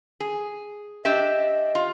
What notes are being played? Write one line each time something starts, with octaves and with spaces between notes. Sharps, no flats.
G#4
D4 G4 D#5 E5
F4